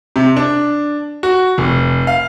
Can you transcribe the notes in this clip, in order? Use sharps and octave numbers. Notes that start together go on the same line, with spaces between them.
C3
D4
F#4
F1
F5